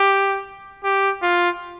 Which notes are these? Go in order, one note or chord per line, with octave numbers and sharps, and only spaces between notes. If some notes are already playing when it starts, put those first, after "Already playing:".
Already playing: G4
G4
F4